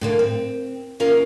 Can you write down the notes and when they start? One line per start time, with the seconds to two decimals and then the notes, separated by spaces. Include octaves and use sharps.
0.01 A2 D3 A#3
0.19 C4
1.00 D#2 A#3 C#4 F4 A#4 F5